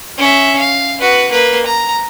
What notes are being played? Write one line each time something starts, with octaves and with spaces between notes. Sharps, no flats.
C#4 E5
F5
F#4 B4
A#3 B4
A#5